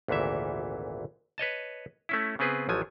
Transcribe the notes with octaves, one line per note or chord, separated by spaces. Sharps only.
G#1 D2 A#2 E3 E5
B4 C#5 D#5 A5
A3 C#4 E4
C#3 B3 C4 G#4 B4
A1 F3 F#3 G#5